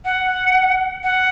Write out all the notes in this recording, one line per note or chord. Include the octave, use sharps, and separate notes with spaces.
F#5
F#5